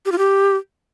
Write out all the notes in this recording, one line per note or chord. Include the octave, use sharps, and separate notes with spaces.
G4
F4
G4